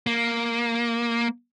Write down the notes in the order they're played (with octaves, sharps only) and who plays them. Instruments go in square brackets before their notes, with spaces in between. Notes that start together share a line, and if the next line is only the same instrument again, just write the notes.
[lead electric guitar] A#3